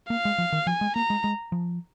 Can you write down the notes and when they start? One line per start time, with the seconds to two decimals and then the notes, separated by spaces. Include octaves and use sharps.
0.10 A#3 F5
0.25 G#3
0.38 F3
0.52 D#3
0.67 F3 G#5
0.81 G#3
0.96 A#3 A#5
1.10 G#3
1.24 G#3
1.52 F3